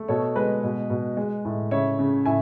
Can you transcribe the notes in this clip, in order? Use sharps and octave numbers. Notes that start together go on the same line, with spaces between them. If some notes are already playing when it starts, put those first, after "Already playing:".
Already playing: A3
B2 A4 C#5
G#3 B4 D#5
B2
B2
G#3
A2
C#3 C#5 E5
C#3
A2 E5 G#5